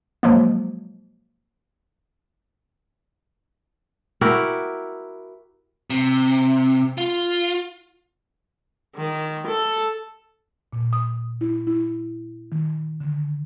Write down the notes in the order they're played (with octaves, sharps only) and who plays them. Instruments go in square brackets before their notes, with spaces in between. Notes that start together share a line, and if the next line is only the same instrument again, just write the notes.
[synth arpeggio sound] B2 F3 F#3 G#3 A#3
[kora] E4 F#4 G4 A#4
[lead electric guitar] C3
F4
[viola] D#3
A4
[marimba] A#2
D#6
E4
E4
D#3
D3